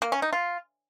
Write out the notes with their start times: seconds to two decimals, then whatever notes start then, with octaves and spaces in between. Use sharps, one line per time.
0.02 A#3
0.12 C#4
0.22 D#4
0.33 F4